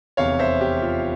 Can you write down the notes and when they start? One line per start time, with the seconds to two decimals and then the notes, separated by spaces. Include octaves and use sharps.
0.17 F1 E2 C3 C#5 F5
0.39 C5 E5
0.61 G4
0.82 F4